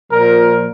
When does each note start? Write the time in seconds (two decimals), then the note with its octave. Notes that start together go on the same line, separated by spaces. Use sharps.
0.11 A#2 F3 A#4